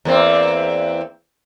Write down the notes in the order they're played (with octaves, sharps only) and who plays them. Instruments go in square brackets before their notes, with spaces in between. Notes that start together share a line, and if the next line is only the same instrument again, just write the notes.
[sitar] E2 A#3 C4